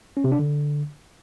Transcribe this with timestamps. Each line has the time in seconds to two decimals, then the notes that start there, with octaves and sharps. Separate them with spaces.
0.17 C#4
0.24 C3
0.32 D4
0.39 D3